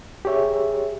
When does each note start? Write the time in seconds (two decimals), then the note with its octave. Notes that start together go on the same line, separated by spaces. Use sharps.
0.25 G4 G#4 C#5 E5